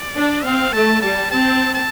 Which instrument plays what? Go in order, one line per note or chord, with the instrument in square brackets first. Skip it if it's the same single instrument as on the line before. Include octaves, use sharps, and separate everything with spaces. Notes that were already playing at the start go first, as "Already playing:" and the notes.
Already playing: [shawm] D5
[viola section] D4
[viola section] C4 [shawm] F5
[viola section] A3 [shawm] A5
[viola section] G3 [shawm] A5
[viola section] C4 [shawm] A5
[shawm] A5